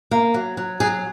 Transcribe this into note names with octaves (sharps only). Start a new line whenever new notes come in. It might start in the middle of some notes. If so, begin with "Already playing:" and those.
A#3
F#3
F#3
F#3 G#4